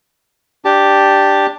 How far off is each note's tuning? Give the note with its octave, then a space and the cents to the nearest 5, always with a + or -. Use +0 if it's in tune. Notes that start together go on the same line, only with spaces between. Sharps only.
D4 +0 G4 +0 A5 +0